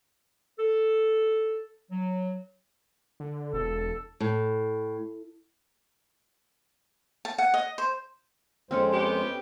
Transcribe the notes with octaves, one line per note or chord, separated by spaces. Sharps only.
A4
F#3
D3
E1 A4
A2
A5
F#5
D#5
C5
F2 G#3 C4 C#4 A4 C5
B3 G4